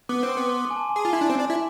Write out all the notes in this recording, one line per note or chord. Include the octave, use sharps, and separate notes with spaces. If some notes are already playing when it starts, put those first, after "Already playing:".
B3 D6
C4
C6
B3 D6
C6
G#5
A5
G#5
G#4
F4
E4
D4
C4
D4
E4